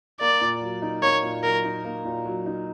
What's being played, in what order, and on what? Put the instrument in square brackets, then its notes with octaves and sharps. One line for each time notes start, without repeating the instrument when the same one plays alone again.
[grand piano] A#3 [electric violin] D5
[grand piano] A#2
F#3
D#4
[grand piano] A#3 [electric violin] C#5
[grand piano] A#2
[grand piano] F#3 [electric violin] A#4
[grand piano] D#4
A#3
A#2
F#3
D#4